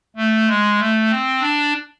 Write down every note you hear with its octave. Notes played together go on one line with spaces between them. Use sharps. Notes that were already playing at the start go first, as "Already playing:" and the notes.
A3
G#3
A3
C4
D4